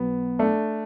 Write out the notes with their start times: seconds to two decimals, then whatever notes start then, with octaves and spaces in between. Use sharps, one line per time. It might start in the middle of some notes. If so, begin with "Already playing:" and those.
Already playing: B1 B2 B3
0.39 A3 D4